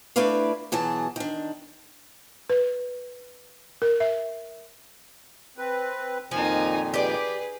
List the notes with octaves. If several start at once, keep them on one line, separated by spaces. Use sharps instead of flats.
A3 D4 E4 B4 D5 F5
B2 E3 F#3 G#4 A5
D#3 D4
B4
A#4
E5
C4 B4
F2 A#2 D#3 F3 D#4 G#5
G4 G#4 B4 D5